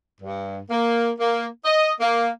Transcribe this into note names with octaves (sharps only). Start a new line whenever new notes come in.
G2
A#3
A#3
D#5
A#3